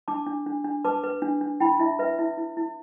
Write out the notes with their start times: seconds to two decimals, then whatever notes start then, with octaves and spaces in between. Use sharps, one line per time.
0.08 D4 A5 D6
0.26 D4
0.46 D4
0.65 D4
0.84 B4 A5 D6
1.03 B4
1.22 D4
1.41 D4
1.60 E4 G5 B5
1.79 E4 E5
1.99 B4 E5
2.18 E4 E5
2.37 E4
2.57 E4